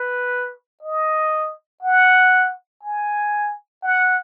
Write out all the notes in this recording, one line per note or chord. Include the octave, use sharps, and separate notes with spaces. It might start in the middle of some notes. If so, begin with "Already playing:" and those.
Already playing: B4
D#5
F#5
G#5
F#5